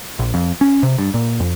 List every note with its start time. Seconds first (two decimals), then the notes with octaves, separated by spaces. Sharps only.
0.19 A#1
0.34 F2
0.61 C#4
0.83 C3
0.98 G2
1.14 A#2
1.40 F2